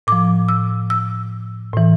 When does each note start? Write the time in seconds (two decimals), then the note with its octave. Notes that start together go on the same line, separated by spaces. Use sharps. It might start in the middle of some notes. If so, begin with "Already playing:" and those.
0.07 A2 F3 D6
0.49 E6
0.90 E6
1.74 A2 E3